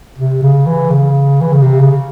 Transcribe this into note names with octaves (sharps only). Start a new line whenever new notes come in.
C3
C#3
E3
C#3
E3
C#3
C3
C#3